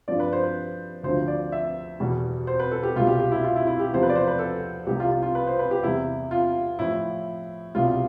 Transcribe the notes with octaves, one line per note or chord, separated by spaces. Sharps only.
G2 F3 D5
B4
C5
B4
D2 D3 F3 C5
D5
E5
E2 B2 G3
C5
B4
A4
G4
C2 B2 G3 F4
G4
G4
E4
F4
E4
E4
G4
E2 C3 F3 C5
B4
D5
C5
B4
A4
C2 C3 G3 G4
F4
F4
F4
B4
C5
B4
G4
E2 C3 G3 E4
F4
A2 F3 E4
C2 B2 G3 F4